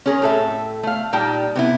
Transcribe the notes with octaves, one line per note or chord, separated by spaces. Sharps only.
C#4 G#4 A#4
A2 A4 E5
A3 F5
A#2 G3 D#4 G5 A5
C3 B3 E4